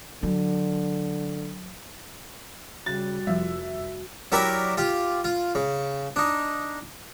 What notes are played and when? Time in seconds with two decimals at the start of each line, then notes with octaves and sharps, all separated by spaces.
0.23 D3 F#3
2.86 C#3 G3 F#4 A6
3.27 F1 F3 G3 E5
4.32 F#3 E4 G4 A#4 D5 E5
4.77 F4 G4
5.24 F4
5.55 C#3
6.16 D4 D#4